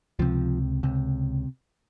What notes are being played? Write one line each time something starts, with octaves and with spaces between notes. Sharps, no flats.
C#2 C3 F3
C#2 C3